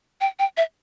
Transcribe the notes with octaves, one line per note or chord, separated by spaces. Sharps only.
G5
G5
E5